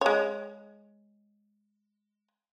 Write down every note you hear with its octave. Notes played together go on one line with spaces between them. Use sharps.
G#3 C#5